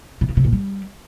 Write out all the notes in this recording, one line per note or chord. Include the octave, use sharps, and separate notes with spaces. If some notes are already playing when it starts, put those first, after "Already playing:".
B2
C#3
C3
A#2
G3